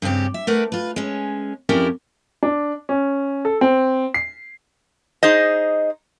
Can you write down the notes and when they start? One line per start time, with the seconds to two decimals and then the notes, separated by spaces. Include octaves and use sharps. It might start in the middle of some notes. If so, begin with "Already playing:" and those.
0.02 G2 C#3 C4 C#4 G4
0.34 E5
0.47 A3 A#4 B4 F#5
0.72 F4 B4
0.96 G#3 C#4
1.69 F2 C#4 E4 G4 A#4 D5
2.43 D4
2.89 C#4
3.45 A4
3.61 C4
4.14 C7
5.23 D#4 G#4 C5 D#5